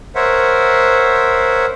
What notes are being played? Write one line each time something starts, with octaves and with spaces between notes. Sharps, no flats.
A#4 C5 C#5 E5 F#5